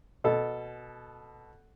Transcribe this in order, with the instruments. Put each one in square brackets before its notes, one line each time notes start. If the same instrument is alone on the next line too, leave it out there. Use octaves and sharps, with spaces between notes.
[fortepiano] B2 A4